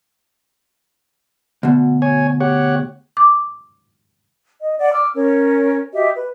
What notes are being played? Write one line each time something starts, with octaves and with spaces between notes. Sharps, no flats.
D2 B2
C#5 G#5
G4 C#5 F#5
D6
D#5
D5 F#5
D6 E6 F6
C#4 A#4 C#5
F#4 G4 D#5 E5
B4